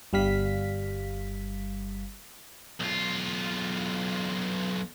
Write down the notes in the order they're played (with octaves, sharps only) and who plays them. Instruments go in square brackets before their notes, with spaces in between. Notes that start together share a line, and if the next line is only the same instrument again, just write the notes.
[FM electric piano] G1 G3 F5 B6
[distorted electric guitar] B1 F4